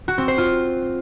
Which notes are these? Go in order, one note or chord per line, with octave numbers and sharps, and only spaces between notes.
F#4
C4
C5
F4